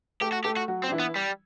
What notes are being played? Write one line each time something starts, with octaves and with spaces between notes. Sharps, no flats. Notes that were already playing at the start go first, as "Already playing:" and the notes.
A3 G4 A4
F#4
A3 G4 A4
F#4
F#3 F#4
C4
D4
E3 E4
B3
G3